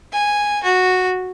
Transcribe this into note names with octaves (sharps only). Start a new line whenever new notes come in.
G#5
F#4